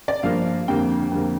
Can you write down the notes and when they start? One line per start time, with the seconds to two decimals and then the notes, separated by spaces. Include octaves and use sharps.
0.08 D5
0.23 G2 F3 A#3 F5
0.68 F2 D3 G3 A#3 G5
1.11 F2 D3 G3 A#3